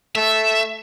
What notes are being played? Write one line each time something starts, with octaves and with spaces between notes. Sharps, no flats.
A3 E5